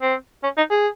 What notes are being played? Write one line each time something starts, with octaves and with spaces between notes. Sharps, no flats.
C4
C#4
D#4
G#4